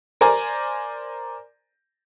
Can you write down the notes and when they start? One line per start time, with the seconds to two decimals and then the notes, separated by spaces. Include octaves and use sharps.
0.21 A#4 C5 D5 G#5 A#5